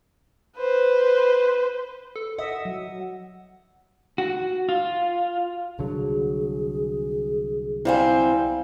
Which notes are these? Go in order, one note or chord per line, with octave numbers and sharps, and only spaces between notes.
B4 C5
A4
D#5 E5 F#5
F#3
F#4
F4
C2 D3 F#3 G#4
C3 G3 C4 E4 F5 G#5